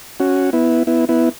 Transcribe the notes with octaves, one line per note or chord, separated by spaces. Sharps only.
C#4 F#4
B3 E4
B3 E4
B3 E4